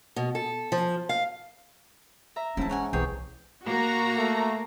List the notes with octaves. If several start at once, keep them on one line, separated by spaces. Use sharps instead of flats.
B2
A4
F3
F5
E5 A#5
G#2 E3 C#4 D#4 E4 A5
C#4 C#5 F#5 G#5
B1 C3 E3 G#4 C#5 G5
A#3 F#4 A#5
A3